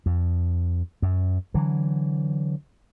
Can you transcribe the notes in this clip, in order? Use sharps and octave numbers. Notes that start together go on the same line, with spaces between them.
F2
F#2
D3 E3 F#3